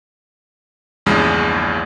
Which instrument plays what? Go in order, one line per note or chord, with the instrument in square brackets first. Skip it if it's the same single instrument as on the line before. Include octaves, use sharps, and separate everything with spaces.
[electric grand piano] A#1 E2 G2 C#3 G#3